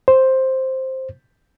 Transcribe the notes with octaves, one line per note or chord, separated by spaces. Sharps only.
C5